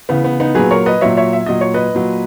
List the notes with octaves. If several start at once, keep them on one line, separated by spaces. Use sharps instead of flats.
C#3 E3 B3
B3
B3 D#4
A#2 F#3 G#4 B4
A#4 C#5
B4 D#5
A#2 F#3 C#5 E5
C#5 E5
E5
A#2 F#3 D#5
C#5
B4 D#5
A#2 F#3